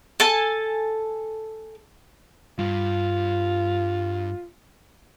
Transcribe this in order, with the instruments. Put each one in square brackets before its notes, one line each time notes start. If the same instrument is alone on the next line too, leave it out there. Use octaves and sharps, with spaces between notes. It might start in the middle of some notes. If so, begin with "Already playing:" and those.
[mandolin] A4 G#5 A5
[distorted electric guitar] G2 [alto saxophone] F4